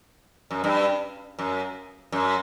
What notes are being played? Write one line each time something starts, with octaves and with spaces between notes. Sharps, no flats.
F#2
G2
F#2
F#2